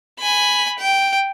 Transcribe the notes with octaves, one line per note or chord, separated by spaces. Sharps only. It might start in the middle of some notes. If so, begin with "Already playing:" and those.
G#5 B5
G5